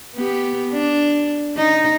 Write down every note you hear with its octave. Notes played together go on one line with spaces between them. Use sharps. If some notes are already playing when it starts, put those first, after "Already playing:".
B3 G4
D4
D#4